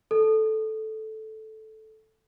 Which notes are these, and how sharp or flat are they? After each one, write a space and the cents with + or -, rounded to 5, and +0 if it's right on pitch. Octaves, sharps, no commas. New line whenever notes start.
A4 -10